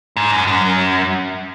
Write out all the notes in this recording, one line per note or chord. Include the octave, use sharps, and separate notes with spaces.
G#2
F#2
F#2